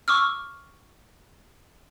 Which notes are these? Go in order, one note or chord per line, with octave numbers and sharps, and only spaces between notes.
C#6 D6 E6 F6